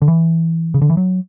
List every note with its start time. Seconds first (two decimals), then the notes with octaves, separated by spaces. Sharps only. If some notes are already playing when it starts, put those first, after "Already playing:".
0.02 D3
0.08 E3
0.74 C#3
0.82 D3
0.90 E3
0.97 F#3